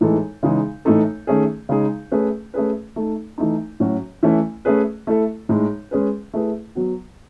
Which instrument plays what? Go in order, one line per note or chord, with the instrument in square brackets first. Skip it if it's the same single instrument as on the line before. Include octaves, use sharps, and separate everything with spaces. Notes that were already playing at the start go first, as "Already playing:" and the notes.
[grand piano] A2 E3 G#3 D#4 A4
C#3 E3 G#3 D#4
A2 E3 A3 D#4 A4
D#3 A3 C#4 G#4
C#3 G#3 D#4 G#4
A3 C#4 G#4 B4
A3 C#4 G#4 B4
A3 D#4 A4
E3 A3 D#4
A2 F#3 C#4 F#4
E3 A3 C#4 E4
A3 C#4 G#4 B4
A3 E4 A4
A2 G#3 D#4
G#3 C#4 G#4 B4
A3 E4 G#4 B4
F#3 B3 F#4